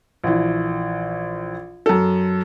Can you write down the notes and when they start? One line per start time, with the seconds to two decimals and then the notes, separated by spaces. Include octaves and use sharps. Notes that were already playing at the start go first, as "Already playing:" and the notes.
0.24 A#1 E3
1.86 F#2 A4